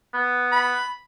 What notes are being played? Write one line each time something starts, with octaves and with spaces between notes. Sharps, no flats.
B3
B5